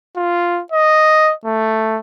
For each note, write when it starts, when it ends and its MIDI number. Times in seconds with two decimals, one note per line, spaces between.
0.17 0.61 65
0.72 1.33 75
1.45 1.99 57